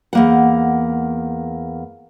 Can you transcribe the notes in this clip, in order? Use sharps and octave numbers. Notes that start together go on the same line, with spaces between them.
E2 A#3 F#5